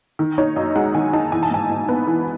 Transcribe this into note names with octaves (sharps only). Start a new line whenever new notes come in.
D#3
D#4 C#5
F#2 D#5
G#3 F#5
D#3 G#5
D#4 A5
E3 G#5
A5
G#2 G#5
G#2
B3
E3